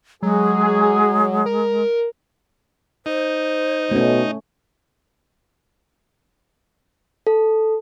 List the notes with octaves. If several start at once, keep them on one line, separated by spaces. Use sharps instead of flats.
F#3 G#3 G#4
A#4
D#4 C5
B2 A3 C#4
A4